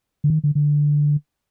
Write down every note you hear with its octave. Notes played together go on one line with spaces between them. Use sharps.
D3
D#3
D3
D3